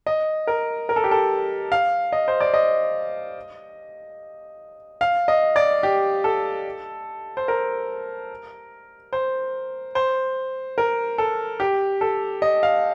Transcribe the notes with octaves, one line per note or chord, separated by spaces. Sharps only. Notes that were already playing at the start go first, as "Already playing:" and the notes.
D#5
A#4
A#4
A4
G4
A4
F5
D#5
C5
D5
D#5
F5
D#5
D5
G4
A4
C5
A#4
C5
C5
A#4
A4
G4
A4
D#5
F5